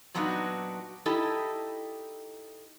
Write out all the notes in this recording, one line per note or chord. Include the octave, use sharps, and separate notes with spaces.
A#2 F#3 B3 D4 D#4 F#4
D#4 E4 G4 A4 D#5